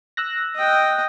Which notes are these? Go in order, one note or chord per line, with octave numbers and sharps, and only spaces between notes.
E6 F#6 A#6
D#5 G5